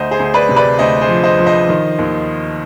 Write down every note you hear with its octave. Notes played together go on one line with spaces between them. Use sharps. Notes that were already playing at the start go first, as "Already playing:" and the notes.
Already playing: D2 C5 D#5
G#4 C5
D2
B4 D5
C3
B4 D5
D2 C5 D#5
G#4 C5
F3
C5 D#5
F3
C5 D#5
D#3
D#2